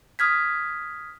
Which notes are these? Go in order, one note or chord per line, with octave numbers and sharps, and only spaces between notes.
D#6 F6 G#6 B6